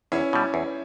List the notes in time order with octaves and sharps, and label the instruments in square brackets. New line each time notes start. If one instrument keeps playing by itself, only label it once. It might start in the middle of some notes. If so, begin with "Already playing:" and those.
[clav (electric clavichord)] E2 [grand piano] C#4 E4
[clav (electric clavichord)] B2 G3
E2